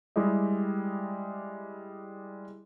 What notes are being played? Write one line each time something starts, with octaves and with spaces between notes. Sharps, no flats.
G3 G#3 E4 G4 D#5